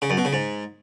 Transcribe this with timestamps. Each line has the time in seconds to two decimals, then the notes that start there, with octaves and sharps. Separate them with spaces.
0.02 C#3
0.10 F#2
0.17 B2
0.25 C#3
0.33 G#2